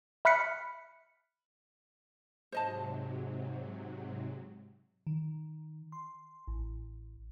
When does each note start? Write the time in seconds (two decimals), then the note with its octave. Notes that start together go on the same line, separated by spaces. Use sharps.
0.25 E5 B5 F6 F#6 B6 C#7
2.52 G#2 C3 F#3 C5 D#5 A5
5.07 D#3
5.92 C6
6.48 A1